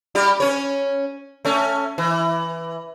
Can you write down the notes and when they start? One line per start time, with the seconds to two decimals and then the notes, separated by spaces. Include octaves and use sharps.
0.15 G3 G4
0.40 C#4 C#5
1.45 A3 C#4
1.98 E3